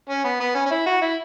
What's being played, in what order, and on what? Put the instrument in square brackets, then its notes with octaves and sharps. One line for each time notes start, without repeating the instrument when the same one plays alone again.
[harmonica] C#4
B3
B3
C#4
C#4
E4
F#4
E4